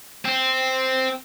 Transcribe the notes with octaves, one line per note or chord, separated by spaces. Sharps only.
C4